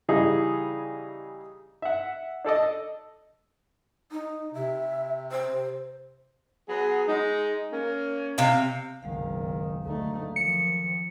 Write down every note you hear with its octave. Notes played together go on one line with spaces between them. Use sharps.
C#3 E3 G3 D#4 G#4
E5 F#5
D4 A4 D5 D#5
D#4
C3 E5
C5
F#3 B3 G#4
G#3 D#4
A#3 C#4
C3 F5 G5
F#1 B1 D#3 F#3 G#3 F5
D2 A3 D#4
D#3 F3 C#7